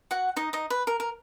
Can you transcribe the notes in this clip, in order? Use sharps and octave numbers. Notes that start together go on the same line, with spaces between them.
F#4 F#5
D#4 D#5
D#4 D#5
B4
A#4
A#4